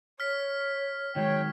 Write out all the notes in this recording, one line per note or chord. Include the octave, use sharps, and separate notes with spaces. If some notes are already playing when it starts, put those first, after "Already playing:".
C#5 F6 B6
D#3 F#3 G#3 C#5 G5